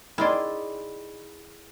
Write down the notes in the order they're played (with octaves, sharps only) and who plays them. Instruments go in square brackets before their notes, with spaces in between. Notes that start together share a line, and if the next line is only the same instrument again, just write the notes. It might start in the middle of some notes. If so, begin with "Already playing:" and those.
[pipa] D#3 C6 [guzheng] E4 G#4 D5